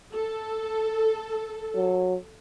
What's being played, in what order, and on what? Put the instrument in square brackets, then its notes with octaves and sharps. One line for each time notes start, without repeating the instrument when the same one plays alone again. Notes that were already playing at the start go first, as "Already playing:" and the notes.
[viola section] A4
[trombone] F#3